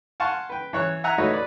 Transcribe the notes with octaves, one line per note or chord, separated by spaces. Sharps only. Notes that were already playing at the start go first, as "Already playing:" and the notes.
F5 F#5 G#5 A5 C6 C#6
B4 G5
E3 C#5 F#6
E5 F#5 G#5 A#5 E6 F#6
A3 D#4 F#4 B4 C#5
B4 D5